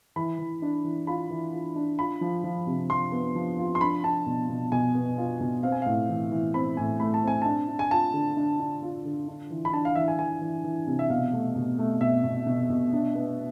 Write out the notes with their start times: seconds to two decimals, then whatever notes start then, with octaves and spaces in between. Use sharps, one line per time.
0.16 E3 B5
0.39 E3
0.62 D4
0.84 E3
1.07 F4 B5
1.30 E3
1.53 F4
1.76 D4
1.98 F4 B5
2.21 F3
2.44 F3
2.67 C3
2.90 F3 C6
3.12 B3
3.35 F3
3.58 F4
3.75 C6
3.81 D4 B5
4.04 D4 A5
4.27 B2
4.49 B2
4.72 B2 G#5
4.95 B3
5.18 F4
5.41 B2
5.63 C4 F5
5.72 G#5
5.82 A2 F5
6.09 E3
6.31 E3
6.54 C4 B5
6.77 A2 G#5
7.00 A3 B5
7.14 A5
7.23 C4 G#5
7.42 D4 A5
7.68 D4
7.79 G#5
7.91 F4 A5
8.14 D3
8.37 D4
8.60 D4
8.82 F4
9.05 D3
9.28 D4
9.51 E3
9.65 B5
9.73 D4 A5
9.85 F5
9.96 E3 E5
10.08 G#5
10.19 E3 G#5
10.41 E3
10.64 E3
10.87 C3
10.99 E5
11.10 B2 F5
11.33 A3
11.56 B2
11.78 A3
12.01 B2 E5
12.24 B2
12.47 B2
12.70 B2
12.93 D4
13.15 B3